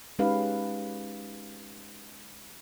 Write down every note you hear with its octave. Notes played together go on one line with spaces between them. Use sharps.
G#3 C#4 D#4 G4 B4 F5